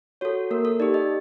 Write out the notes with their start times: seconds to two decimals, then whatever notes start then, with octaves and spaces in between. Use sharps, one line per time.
0.21 F#4 A4 C#5
0.51 A#3 A#4
0.65 A4
0.80 D#4 G4 D5
0.94 D#5